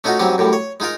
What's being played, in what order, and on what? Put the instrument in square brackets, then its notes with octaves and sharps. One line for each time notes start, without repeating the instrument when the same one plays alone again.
[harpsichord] A3 C#4 D#4 F4 F#4
G#2 F#3 G3 C4 C#4
F#2 A2 G3
C#5
G#3 D#4 F4 A#4